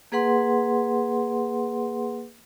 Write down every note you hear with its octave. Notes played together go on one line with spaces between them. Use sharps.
A#3 G#4 B4 F#5 C6